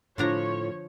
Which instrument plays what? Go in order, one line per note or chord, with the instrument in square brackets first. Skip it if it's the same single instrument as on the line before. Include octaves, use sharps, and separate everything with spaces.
[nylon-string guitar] A2 F4 [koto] D3 D4 A#5 [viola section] F3 C#5